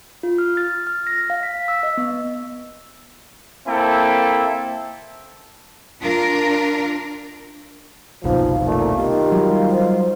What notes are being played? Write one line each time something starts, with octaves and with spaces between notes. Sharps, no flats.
F4
F6
A6
F6
A#6
F5
B6
E6
D#5
B3
A#3 C4 E4 A4 E5 G5
D4 F4 A#4
F#1 C2 B2 F3 D#4
A#2 A3
D#3 F4 G4
F#3 G3
C5